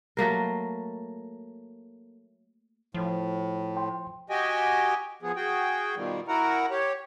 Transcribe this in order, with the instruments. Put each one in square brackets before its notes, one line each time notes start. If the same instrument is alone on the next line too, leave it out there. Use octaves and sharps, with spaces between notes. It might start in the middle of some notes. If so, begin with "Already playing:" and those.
[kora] F#3 A3 A#3 A#4
[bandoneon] A2 [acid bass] F3
[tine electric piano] G5 C6
[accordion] F#4 G4 D#5 G5 G#5
F3 B3 G#4
F#4 G#4 G5
B2 D#3 F3 G3
E4 F#4 A#4 F#5 A#5
G4 C#5